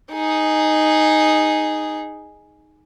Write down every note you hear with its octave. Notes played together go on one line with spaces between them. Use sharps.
D#4 G#4